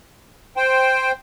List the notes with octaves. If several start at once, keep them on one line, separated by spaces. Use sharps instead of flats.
C5 G5